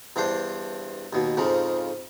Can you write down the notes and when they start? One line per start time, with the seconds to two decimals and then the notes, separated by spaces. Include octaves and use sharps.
0.16 E2 G2 D4 C5
1.13 D#2 B2
1.37 F2 G#2 C#3 F3